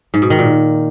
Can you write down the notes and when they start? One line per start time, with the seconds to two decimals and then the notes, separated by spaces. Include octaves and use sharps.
0.14 G#2
0.22 B2
0.30 D#3
0.39 A#2